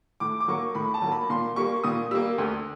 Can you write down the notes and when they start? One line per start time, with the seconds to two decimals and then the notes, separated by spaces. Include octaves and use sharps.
0.20 A2 D6
0.40 D6
0.48 F#3 A#3 C#6
0.75 A2 B5
0.94 A5
1.02 F#3 A#3
1.12 B5
1.30 A#2 C6
1.56 G3 A#3 C#6
1.83 A#2 D#6
2.11 G3 A#3 E6
2.38 D2